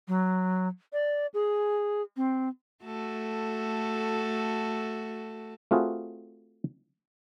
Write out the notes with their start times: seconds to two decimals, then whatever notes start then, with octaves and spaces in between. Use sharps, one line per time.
0.08 F#3
0.93 D5
1.34 G#4
2.17 C4
2.84 A3 F#4 A4
5.71 A3 C4 F4 F#4 G#4 B4